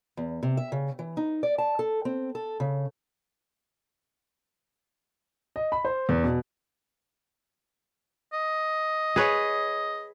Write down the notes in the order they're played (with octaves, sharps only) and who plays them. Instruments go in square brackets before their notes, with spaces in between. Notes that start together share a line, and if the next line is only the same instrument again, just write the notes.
[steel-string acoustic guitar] E2
C3
E5
C#3
E3
D#4
D5
A5
A4
C4
A4
C#3
[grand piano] D#5
B5
C5
E2
B2
[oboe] D#5
[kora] G#4 B4 C#5